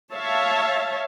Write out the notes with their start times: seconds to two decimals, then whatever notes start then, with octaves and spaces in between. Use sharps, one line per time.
0.12 C#5 E5 F5 A5